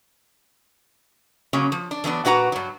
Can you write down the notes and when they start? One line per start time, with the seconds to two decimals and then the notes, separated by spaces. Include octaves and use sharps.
1.53 C#3 F#3 A#3 C#4
1.72 F3
1.91 D4
2.04 E3 F#3 B3 D4
2.25 A#2 D4 F#4 B4 F#5 A#5
2.52 G2 F#3